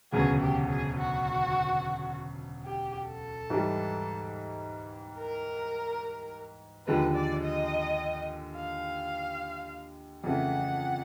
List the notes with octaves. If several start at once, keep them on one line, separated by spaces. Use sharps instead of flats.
E1 D2 C#3 F#3 B3 G#4
G4
G#4
F#4
G4
A4
G#2 E3 G3
A#4
D#2 D3 F3 G#3 B4
D5
D#5
F5
F2 C#3 E3 A3 F#5